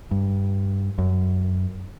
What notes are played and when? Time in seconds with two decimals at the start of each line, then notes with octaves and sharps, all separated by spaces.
0.11 G2
0.98 F#2